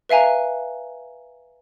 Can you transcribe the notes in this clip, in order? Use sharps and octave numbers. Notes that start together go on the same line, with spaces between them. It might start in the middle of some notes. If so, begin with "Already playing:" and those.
B4 E5 F5 G#5 A#5